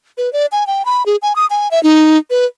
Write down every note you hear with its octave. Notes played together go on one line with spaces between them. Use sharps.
B4
D5
G#5
G5
B5
G#4
G#5
D#6
G#5
E5
D#4
B4